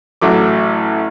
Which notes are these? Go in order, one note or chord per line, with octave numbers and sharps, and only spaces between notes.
A1 F#3 A3 D6